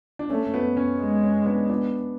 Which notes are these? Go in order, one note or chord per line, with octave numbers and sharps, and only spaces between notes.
D4
A3 C#4
B3
C#4
G#3
C#4
B3 D4
B3 D4